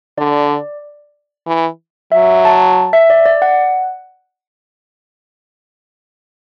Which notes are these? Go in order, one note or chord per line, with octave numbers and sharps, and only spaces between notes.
D3 D5
E3
F#3 E5
A5
E5
D5
D5
F#5